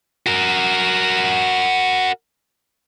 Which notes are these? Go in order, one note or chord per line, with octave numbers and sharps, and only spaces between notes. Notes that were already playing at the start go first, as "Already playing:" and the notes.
F#4 A#4